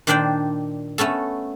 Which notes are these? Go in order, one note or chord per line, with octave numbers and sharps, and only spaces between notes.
A#2 D#3 D4 C5 D5 G5
A3 B3 C#4 A4